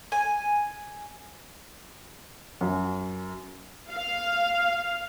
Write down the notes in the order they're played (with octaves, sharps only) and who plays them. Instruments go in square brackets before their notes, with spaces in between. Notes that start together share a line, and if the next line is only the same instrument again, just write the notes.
[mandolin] G#5
[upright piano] F#2
[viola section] F5